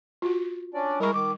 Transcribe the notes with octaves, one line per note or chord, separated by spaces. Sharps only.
F4 F#4
C#4 D4 D5
G3 G#3 E4 A#4 C#6
D#3 D6